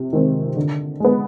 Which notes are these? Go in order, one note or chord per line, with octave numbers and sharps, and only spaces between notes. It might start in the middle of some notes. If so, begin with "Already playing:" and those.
Already playing: C3
D#3 G#3 C4
D3
G#3 B3